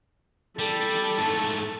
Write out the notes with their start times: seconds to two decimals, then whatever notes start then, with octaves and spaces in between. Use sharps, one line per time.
0.59 G3 A4
1.18 G#2 A3